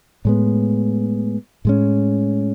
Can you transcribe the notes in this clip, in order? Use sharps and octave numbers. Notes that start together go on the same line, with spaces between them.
A2 G#3 B3
A2 G#3 C#4